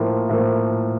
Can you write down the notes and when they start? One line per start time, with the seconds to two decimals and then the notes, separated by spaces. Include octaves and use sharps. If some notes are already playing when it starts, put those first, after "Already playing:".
Already playing: A2 F3 A#3
0.29 A2 F3 A#3